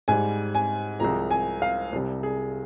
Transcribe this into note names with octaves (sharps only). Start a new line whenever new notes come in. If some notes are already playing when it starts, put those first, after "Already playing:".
G#2 G3 G#5
G#5
C2 C3 F3 G#3 A#5
G#5
F5
C2 C3 G3
G#4